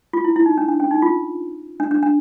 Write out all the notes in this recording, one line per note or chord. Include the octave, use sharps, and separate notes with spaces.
F4
E4
E4
D#4
D4
D4
C#4
D#4
F4
D4
D4
D4